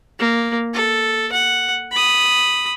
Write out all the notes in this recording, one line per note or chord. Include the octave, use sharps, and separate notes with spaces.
A#3
A4
F#5
B5 D#6